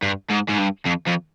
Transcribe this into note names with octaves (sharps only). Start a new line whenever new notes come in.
G2
G#2
G#2
G2
F2
F2